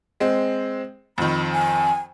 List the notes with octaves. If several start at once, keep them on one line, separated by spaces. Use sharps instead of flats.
G#3 C4
F2 D#3 B5
G#5